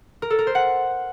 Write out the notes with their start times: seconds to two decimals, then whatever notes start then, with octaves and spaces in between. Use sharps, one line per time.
0.22 A#4
0.30 A4
0.39 A#4
0.47 C5
0.55 F#5